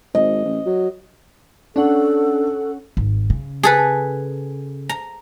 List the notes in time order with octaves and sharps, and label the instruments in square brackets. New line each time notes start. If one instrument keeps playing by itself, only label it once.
[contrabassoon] G#1 [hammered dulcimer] D#5
[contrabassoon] A1
F#3
[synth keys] C#4 F#5 [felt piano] D4 [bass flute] A4
[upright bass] G#1
C#3
[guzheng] G#4 A4 B4
A#5